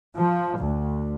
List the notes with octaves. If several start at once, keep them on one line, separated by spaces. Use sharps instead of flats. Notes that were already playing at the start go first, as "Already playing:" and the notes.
F3
D2